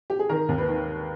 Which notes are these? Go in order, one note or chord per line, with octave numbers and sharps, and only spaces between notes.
G4
G#4
D#3 A#4
D#2
B4
D#3